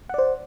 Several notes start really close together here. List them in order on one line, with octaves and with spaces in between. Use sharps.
F#5 D5 C5